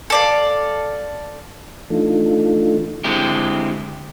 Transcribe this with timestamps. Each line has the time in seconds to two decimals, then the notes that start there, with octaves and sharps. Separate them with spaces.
0.10 A4 D5 F5
1.90 E3 A3 D4 D#4 F4 A4
3.04 D3 G#3 C4 E4 G4